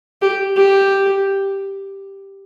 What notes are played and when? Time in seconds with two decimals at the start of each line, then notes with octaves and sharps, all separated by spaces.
0.22 G4
0.56 G4